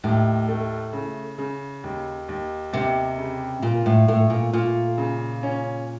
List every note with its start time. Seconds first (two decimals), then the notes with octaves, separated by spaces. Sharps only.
0.04 D#2 A2
0.48 A3
0.93 C#3
1.38 C#3
1.84 D#2
2.29 D#2
2.73 D#2 C3
3.18 C#3
3.62 A#2 F4
3.86 A2
4.08 A2 A3
4.30 A#2
4.53 A#2 F4
4.98 C#3
5.43 C#4